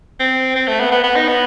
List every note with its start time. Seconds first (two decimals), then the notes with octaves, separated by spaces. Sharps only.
0.20 C4
0.56 C4
0.68 A3
0.80 B3
0.91 B3
1.04 B3
1.16 D#4
1.28 B3